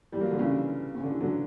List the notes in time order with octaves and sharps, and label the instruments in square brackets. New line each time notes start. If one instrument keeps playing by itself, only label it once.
[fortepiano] E3 G3
F#3 A#3
D3
C#3 E3
C#3
D3
E3
D3 F#3